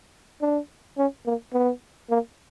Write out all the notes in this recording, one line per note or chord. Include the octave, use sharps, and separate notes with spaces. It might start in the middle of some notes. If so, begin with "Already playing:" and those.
D4
C#4
A#3
B3
A#3